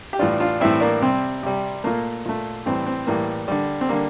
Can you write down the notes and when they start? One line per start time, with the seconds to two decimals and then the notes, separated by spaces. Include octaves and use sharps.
0.13 G4
0.19 A2 E3 G3 D4 F4
0.40 D4 F4
0.60 A2 E3 G3 C4 E4
0.81 A#3 D4
1.02 C3 G3 C4
1.43 C3 G3
1.84 A#2 A3 A#3
2.25 A#2 A3
2.66 A2 E3 G3 C4
2.86 C4
3.07 A2 E3 G3 A#3
3.48 D3 G3
3.81 C4
3.89 D3 G3 A#3